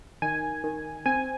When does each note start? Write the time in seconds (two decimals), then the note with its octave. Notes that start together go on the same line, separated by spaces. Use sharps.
0.22 D#3 G#5
0.64 D#3
1.06 C4 G#5